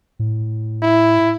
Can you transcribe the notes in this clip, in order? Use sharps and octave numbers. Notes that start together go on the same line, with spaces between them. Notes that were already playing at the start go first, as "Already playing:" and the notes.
A2
E4